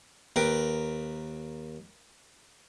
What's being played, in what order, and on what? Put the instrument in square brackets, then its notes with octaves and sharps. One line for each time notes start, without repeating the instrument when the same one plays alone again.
[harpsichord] D#2 A#4 B4 G5